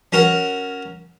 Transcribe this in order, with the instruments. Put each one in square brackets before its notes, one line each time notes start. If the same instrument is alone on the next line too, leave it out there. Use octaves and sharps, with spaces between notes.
[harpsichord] C#4 F#4 A#4 F#5